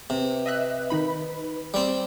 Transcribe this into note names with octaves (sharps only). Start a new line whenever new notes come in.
C3 B4
D#5 E5 F#6
D#3 D#4 B5
G3 C4